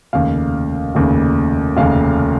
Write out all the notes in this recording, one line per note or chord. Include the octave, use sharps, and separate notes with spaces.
F1 D#2 C#3 F5
F1 D#2 C#3
F1 D#2 C#3 F5